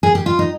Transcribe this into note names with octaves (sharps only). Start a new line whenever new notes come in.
G#4
G4
F4
D#4